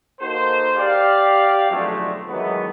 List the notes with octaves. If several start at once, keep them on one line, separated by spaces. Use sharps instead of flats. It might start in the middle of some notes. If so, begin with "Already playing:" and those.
A#3 D#4 F#4 A4 C5
G4 D5 F5
B1 F2 D3 F#3 G#3 A3
D#3 E3 F#3 G#3 A3 B3